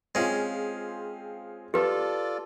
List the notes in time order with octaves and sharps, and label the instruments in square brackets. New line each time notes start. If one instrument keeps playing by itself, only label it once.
[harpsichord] G#3 C#4 [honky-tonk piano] C4 F4 G#4
[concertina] F4 A4 D5 [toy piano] G4 B4